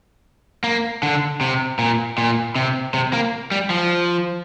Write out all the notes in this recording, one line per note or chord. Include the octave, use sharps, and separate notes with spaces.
A#3
D3
C3
A#2
A#2
C3
C3
A#3
G3
F3